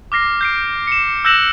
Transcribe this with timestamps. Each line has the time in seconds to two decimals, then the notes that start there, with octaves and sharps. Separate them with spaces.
0.12 D6 F6 A#6 C7
0.41 G6 C7 D7
0.87 C#7 E7
1.25 E6 F#6 G6 A#6 E7 F#7